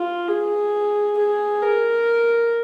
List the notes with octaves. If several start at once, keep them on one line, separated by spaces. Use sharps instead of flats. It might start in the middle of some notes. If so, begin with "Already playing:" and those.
Already playing: F4
G#4
G#4
A#4